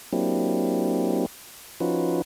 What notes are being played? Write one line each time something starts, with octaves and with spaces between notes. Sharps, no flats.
F#3 A#3 C4 D4 E4 G4
F3 C#4 D#4 F4 F#4 B4